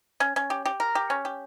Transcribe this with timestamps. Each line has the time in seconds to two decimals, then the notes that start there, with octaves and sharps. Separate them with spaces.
0.20 C#4
0.36 C#4
0.50 G4
0.66 G4
0.80 A#4
0.95 G4
1.10 C#4
1.25 G4